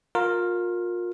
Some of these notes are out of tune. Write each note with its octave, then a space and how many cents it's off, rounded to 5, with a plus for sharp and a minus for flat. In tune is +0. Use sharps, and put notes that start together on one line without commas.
F4 +30 A#4 +0